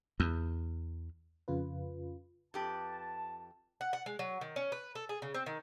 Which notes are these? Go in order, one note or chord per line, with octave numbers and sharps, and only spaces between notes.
E2
F2 C#3 F4 B4
F2 G4 B4 A5
F#5
F#5
G#3
F#3
D#3
C#4
B4
A4
G#4
C#3
C4
D#3